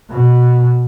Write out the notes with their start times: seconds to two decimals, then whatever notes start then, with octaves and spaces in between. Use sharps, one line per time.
0.10 B2